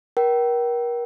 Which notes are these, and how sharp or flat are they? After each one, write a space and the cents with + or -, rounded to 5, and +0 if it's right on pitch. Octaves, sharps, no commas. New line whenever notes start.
A#4 +35 G5 -30